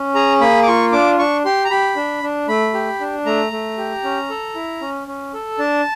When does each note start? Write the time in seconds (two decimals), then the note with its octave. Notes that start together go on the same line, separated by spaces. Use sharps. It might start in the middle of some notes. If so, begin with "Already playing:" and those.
Already playing: C#4
0.15 G#4 A#5
0.41 A#3 B5
0.63 D6
0.67 F4 C#6
0.92 D4 D6
1.19 D4 C#6
1.45 G4 C6
1.65 A#5
1.71 G4 B5
1.96 D4
2.23 D4
2.48 A3 B5
2.74 G4
3.00 D4
3.26 A3 A#5
3.52 A3
3.78 G4
4.04 C#4
4.30 A4
4.55 E4
4.81 C#4
5.07 C#4
5.34 A4
5.59 D4 A5